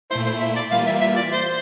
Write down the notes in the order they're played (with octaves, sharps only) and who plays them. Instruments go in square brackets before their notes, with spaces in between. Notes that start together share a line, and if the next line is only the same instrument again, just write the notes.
[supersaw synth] A#2 A3 E4 [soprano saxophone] C5
[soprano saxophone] C5
E5
D5
[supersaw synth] E3 G3 A#3 F4 [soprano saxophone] F5
[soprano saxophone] E5
E5
D5
C5